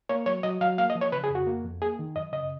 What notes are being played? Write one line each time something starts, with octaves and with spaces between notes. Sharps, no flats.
A#3 C#5
F#3 C#5
F#3 D#5
F#3 F5
A#3 F5
D#5
F3
C#5
C#3 B4
G#4
F2 F#4
A#3
F2
A#3 G#4
D#3
F#2 D#5
C#3 D#5